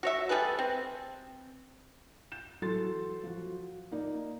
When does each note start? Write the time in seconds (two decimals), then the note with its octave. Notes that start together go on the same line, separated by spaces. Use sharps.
0.03 F#4 C#5 E5
0.29 G3 G#4 A4 B4
0.59 C4
2.32 G6 E7
2.62 E3 F#3 F#4 A4 C6 A6
3.24 F3 F#4
3.92 A#3 D#4 D5